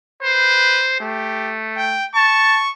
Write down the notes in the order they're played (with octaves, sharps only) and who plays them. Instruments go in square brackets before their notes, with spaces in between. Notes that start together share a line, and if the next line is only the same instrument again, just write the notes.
[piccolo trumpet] B4 [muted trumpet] C5
[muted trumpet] A3 [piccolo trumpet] G4
[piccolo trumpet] G5
[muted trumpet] A5 [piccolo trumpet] C#6